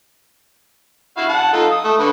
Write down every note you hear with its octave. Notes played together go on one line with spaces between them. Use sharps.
E4 F#4 F5
F#5 A5
D#4 F4 A4
D#6
A3
D3 B4 C#6